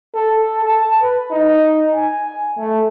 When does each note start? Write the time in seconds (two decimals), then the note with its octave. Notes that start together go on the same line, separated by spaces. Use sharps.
0.14 A4
0.64 A5
1.01 B4
1.31 D#4
1.95 G#5
2.57 A3